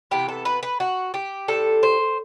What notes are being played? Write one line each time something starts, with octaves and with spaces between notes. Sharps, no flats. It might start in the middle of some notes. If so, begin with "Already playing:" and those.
C3 E3 B3 G4
A4
B4
B4
F#4
G4
A2 G3 C4 A4
C5